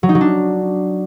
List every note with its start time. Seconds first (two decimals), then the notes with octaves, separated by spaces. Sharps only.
0.03 F#3
0.09 D#4
0.15 F#3
0.21 D4